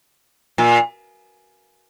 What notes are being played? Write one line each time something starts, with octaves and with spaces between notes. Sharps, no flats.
A#2